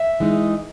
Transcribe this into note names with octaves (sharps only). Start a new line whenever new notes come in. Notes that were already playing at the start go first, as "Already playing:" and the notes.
Already playing: E5
E3 G#3 D#4